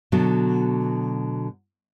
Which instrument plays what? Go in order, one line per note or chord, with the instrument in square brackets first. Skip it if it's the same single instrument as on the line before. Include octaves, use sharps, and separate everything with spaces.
[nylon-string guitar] B2 D3 F#3 A3 F#4